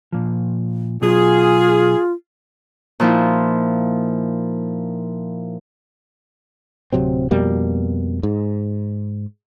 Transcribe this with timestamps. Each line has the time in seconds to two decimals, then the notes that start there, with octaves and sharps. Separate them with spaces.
0.13 A#2 F3
1.02 B2 F#3 F4 G#4
3.00 A#2 F3 D#4 E4
6.93 D1 C3 F#3 C4
7.31 F2 B2 G3 A#3
8.23 G#2